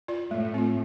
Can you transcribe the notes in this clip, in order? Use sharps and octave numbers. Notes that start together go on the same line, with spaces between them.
F4 D5
A2 A3
C4 F4